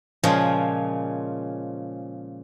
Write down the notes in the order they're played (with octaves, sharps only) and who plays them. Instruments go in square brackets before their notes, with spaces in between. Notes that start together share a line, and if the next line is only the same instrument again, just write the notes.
[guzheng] A#2 C#3 F3 G#3 C#4